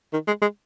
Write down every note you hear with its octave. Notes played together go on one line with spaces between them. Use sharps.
D#3
G#3
G#3